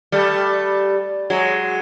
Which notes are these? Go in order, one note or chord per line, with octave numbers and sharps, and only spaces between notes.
G3 A3
F#3 G#3